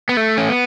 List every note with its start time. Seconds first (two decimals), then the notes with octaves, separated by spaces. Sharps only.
0.09 B3
0.17 A3
0.38 C#4
0.49 B3